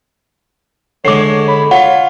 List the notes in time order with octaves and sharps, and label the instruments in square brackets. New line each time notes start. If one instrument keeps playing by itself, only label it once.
[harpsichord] D3 G#3 [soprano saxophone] C#5 [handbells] D6 C7
[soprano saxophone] B5
[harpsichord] F4 [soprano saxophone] C#5 [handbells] F#5